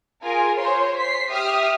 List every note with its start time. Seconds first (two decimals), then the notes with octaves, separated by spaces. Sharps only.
0.23 F4 G#4 A#4 G#5
0.59 C5 C#5 C6
0.98 B6 C7
1.31 G4 E5 D#6 F6